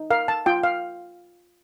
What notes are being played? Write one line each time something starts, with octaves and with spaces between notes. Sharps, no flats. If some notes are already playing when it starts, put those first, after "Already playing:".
Already playing: D#4
A#4 F5
A5
F4 G5
F5